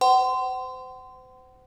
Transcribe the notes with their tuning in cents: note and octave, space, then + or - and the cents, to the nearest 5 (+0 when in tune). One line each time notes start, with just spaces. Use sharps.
C5 -30 F#5 +40 C6 -25